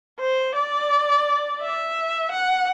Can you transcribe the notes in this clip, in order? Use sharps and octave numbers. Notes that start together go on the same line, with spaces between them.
C5
D5
E5
F#5